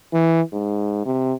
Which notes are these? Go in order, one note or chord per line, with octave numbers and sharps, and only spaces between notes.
E3
G#2
C3